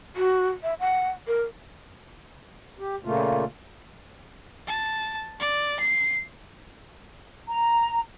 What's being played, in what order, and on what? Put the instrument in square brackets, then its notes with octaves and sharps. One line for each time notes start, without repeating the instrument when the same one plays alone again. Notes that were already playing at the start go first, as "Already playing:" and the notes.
[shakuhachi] F#4
E5
F#5
A#4
[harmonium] G4
A#2 C#3 A3 A#3 F4
[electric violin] A5
D5
C7
[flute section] A#5